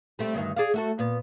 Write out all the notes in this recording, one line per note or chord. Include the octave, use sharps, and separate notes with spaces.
G3 A3 C4
D2 G2 D#3
G#4 D5 F5
A3 F#4 A4
A#2 B3